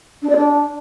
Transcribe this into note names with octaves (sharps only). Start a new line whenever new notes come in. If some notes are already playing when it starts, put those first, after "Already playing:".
D4
D5
D4